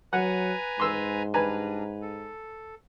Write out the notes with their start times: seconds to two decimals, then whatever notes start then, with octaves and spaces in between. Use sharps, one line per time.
0.13 F#3 B4 F#5 G#5 A#5
0.80 G#2 C6 E6
1.34 G3 D4 B4 G#5 A#5
2.02 A4